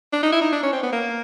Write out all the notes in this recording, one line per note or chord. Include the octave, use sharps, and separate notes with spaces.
D4
D#4
E4
D#4
D4
C#4
C4
B3
A#3